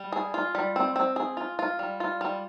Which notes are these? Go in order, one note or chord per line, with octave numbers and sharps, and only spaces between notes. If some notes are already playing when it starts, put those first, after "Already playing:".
Already playing: G3
G#4
F4
G3
C4
C4
G#4
F4
F4
G3
F4
G3